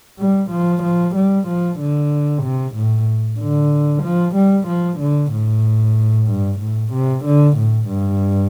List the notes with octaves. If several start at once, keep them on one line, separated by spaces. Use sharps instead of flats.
G3
F3
F3
G3
F3
D3
C3
A2
D3
F3
G3
F3
D3
A2
G2
A2
C3
D3
A2
G2